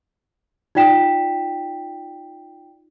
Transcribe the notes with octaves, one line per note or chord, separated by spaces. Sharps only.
D#4 F4 D5 G5 B6 E7